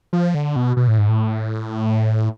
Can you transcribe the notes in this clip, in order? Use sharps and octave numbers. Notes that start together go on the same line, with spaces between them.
F3
D3
B2
B2
A2
G#2
A2